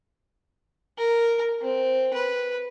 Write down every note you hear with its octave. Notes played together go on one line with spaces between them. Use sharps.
A#4
C4
B4